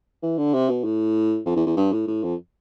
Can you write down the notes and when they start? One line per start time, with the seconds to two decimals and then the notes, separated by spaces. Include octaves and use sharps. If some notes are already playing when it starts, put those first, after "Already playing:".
0.23 E3
0.38 D3
0.54 C3
0.69 B2
0.84 A2
1.46 F2
1.56 E2
1.67 E2
1.77 G2
1.92 A2
2.07 A2
2.23 F2